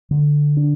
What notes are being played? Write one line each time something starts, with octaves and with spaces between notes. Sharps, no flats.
D3
D4